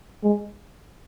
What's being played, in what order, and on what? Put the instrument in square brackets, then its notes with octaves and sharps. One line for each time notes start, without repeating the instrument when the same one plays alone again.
[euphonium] G#3